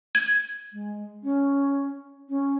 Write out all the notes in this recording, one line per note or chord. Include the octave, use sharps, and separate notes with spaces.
G#6
G#3
C#4
C#4